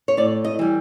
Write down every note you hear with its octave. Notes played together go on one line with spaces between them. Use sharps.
C#5
A2 D5
D#5
E3 G3